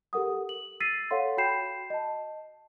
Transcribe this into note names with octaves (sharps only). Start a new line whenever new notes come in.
G4 A4 A#4 F#5 D#6
F#7
E6 A6 B6 C7 D#7
A4 C#5 F5 F#5 C6
F#4 G5 B5 G6 C7 E7
D#5 A5